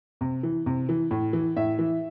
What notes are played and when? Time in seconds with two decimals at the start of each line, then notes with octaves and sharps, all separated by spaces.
0.21 C3
0.43 E3
0.66 C3
0.89 E3
1.11 A2
1.33 E3
1.56 A2 E5
1.79 E3